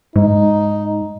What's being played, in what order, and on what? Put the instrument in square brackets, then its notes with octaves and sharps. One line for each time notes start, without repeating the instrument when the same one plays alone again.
[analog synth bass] G#2 [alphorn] D#4